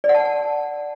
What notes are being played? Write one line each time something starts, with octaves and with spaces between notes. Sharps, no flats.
D5
F#5
A5
F#5
A5